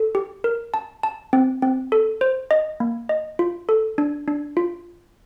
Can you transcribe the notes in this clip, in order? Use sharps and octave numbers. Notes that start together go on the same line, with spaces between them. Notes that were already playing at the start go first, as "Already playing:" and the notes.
Already playing: A4
G4
A#4
A5
A5
C4
C4
A4
C5
D#5
A#3
D#5
F4
A4
D4
D4
F4